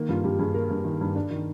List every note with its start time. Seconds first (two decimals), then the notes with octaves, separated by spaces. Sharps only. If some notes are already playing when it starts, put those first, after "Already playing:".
Already playing: D#3 A#3
0.09 G2 F4
0.24 G2 G4
0.39 G2 G#4
0.54 A#3 A#4
0.70 G2
0.85 D#3
1.01 G2
1.16 D4
1.31 D#3